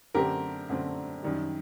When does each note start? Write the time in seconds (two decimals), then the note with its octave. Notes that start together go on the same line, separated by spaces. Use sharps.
0.14 F#2 D3 A3 C4 G4 A#4
0.69 F#2 D3 A3 C4
1.22 F#2 D#3 G3